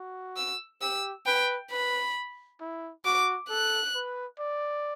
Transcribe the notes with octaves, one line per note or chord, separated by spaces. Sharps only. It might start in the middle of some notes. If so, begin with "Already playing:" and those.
Already playing: F#4
E6
G4 E6
B4 G5
B4 B5
E4
F#4 D6
A4 F#6
B4
D5